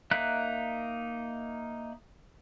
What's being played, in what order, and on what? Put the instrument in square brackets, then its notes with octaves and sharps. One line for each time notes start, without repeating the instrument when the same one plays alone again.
[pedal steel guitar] A#3 D#4 E5 F#6